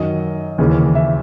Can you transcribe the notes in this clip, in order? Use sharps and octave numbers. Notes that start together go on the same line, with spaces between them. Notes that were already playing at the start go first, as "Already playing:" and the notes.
Already playing: F#2 D#3 F#3 D#5
D#2 C#3 E3
E5